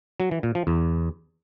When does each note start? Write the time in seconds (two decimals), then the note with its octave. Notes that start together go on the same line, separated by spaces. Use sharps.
0.20 F#3
0.31 E3
0.43 A#2
0.55 F3
0.67 E2